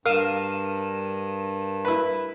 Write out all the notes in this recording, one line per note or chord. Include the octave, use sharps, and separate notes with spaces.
G2 A#4 F5 D#7 E7
E4 B4